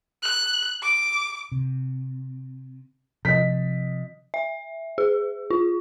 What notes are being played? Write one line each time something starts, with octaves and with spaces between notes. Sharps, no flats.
F#6
D6
C3
C3 F3 D#5 B6
E5
G#4
F4